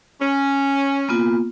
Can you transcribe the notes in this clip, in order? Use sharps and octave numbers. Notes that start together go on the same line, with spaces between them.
C#4
A#3 B3 F4